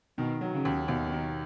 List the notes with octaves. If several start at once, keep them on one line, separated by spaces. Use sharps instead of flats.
B2 D#3
F#3
C#3
D#2
D#2 B2
D#3